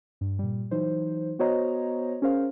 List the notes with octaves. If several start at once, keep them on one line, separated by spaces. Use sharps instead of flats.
G2
A#2 G3
E3 F#3 D#4 C5
B3 F#4 C5 C#5 D#5 A#5
C#4 G#4 A#4 C5 F5